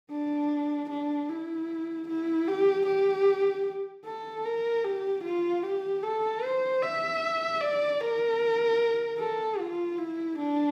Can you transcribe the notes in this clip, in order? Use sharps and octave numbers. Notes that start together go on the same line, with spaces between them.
D4
D4
E4
E4
G4
G4
A4
A#4
G4
F4
G4
A4
C5
E5
D5
A#4
A4
F4
E4
D4